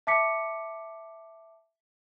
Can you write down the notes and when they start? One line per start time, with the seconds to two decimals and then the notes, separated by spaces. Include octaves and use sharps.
0.07 E5 A5 D6 B6 C#7